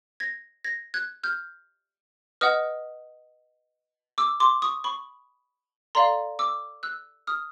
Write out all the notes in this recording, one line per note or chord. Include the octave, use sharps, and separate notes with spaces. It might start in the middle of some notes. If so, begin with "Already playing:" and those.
G#6 A#6
G#6 A#6
F#6 G#6
F6 G6
B4 D#5 F#5 D#6 F6
D6 E6
C6 D6
C#6 D#6
B5 C#6
A4 D5 F5 A#5 C6
D6 E6
E6 F#6
D#6 F6